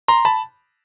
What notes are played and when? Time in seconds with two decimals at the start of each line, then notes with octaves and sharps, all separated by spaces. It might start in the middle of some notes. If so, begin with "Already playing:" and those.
0.08 A#5 C6
0.25 A5 B5